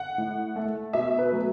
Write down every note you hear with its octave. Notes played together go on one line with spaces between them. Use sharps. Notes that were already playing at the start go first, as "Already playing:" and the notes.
Already playing: F#5
A2
A3
B2 E5
B4
F#3 A3